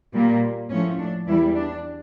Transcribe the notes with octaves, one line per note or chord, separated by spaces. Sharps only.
A#2 G3 A#3
A2 F3 A3 C#4
D4
E2 E3 G3 E4
D4